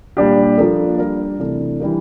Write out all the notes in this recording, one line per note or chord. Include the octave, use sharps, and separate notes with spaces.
A#2 G3 D4 G4
F3 A#3 D4 A4
G3 D4 G4 A#4
C3 E3 A3 D4
E3 G3 D4 G4 A#4